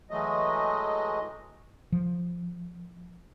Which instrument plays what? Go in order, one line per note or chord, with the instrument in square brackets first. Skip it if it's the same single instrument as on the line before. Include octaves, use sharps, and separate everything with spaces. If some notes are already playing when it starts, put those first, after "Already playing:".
[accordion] E3 F#3 G#3 A3 D#5
[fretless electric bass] F3